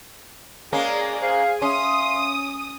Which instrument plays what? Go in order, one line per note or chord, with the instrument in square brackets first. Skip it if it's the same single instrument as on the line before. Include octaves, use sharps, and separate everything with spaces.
[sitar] G#3 A#3 C#4 [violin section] G#4 D5
[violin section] G#4 [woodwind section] C5 F5
[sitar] C#4 [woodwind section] E5 F5 C6 [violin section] D#6